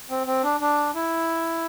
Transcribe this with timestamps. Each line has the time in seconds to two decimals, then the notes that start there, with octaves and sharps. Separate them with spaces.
0.10 C4
0.27 C4
0.43 D4
0.60 D4
0.95 E4